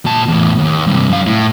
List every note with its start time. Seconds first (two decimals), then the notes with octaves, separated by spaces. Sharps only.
0.05 A#2 A5
0.28 E2 A2
0.59 D#2
0.87 G2 C3
1.09 F#2 F5
1.26 A2